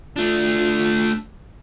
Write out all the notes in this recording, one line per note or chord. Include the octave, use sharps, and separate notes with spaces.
A3 D4 F4